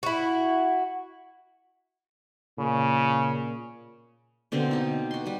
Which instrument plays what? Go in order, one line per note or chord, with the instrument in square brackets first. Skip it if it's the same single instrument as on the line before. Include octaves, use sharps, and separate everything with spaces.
[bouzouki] E4 F#4
[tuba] A#2 [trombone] C#3
[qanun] B2 D3 A#3 C4
D#4 G4
F#4 C6
G3 B4